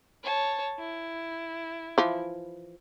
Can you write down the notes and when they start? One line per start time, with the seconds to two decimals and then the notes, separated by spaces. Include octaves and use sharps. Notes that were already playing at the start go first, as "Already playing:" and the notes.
0.24 C#5 A5
0.78 E4
1.98 E3 F3